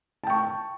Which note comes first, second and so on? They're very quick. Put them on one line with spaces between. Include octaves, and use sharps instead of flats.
A5 G5 C#6